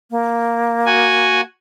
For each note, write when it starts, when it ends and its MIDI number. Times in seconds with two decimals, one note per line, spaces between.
0.11 1.42 58
0.86 1.41 66
0.86 1.41 80